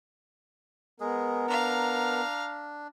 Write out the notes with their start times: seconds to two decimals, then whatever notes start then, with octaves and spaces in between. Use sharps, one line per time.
1.00 G#3 B3 G#4 A#4
1.48 D4 F5 A#5